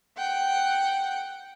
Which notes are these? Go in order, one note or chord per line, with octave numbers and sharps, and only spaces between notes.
F#5 G5